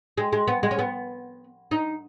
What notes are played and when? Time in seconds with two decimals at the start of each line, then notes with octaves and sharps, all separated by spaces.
0.18 G#3
0.33 G#3
0.47 B3
0.63 G#3
0.71 C#4
0.79 B3
1.71 D#4